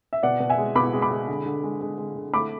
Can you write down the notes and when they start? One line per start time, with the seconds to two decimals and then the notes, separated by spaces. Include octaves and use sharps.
0.13 E5
0.23 B2 D5 F#5
0.40 B2
0.50 E5 G#5
0.58 G#3
0.75 B2 B5 D6
0.93 G#3
1.02 B5 D6
1.11 G#3
1.28 D3
1.46 D3
1.63 G#3
1.81 G#3
1.98 G#3
2.16 D3
2.34 A3 B5 D6